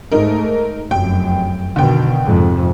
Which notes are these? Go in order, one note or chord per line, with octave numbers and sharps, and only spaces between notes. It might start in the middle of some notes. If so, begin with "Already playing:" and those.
G#2 A3 D#4 A#4
F1 F#2 G5
B2 D3 D#3 G5
F2 G#2 C3